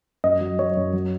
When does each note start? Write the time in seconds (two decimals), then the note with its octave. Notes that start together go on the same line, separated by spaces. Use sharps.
0.24 F#2 D#5
0.41 F#3
0.59 F#3 C#5
0.77 F#2
0.93 F#3